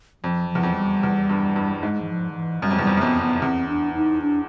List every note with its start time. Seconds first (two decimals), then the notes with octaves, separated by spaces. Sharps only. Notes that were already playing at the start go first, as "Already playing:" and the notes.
0.23 F2 F3
0.50 F3
0.55 E2
0.63 F2
0.76 G3
1.03 E2
1.29 G2
1.56 G2
1.82 G#2 G#3
2.02 E3
2.09 F3
2.31 D#3
2.35 E3
2.62 F#2 G3
2.71 F2
2.79 E2
2.82 F2 G3
2.97 F#2
3.02 F2 B3
3.22 B3
3.42 E2 C4
3.69 D4
3.95 D#4
4.22 D4